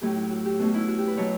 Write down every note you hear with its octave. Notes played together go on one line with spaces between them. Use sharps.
A2 F#3 C#4 G4
E4
F#4
G4
B2 A3 C#4 F#4
E4
F#4
G4
B4
B2 F#3 B3 C#5